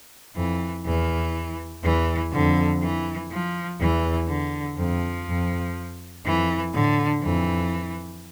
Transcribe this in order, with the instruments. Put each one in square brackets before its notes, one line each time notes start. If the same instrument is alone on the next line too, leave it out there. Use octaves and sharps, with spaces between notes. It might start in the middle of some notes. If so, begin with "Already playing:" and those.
[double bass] F2 [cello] E3
[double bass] E2 [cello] E3
[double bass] E2 [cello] E3
[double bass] F2 [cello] D3
[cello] E3
F3
[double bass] E2 [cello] E3
[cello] D3
[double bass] F2 [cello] F3
[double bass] F2
[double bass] F2 [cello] E3
[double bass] A2 [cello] D3
[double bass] F2 [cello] E3